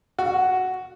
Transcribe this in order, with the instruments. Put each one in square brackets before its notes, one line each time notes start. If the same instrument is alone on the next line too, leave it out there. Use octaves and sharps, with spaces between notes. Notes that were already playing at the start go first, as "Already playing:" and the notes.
[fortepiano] F#4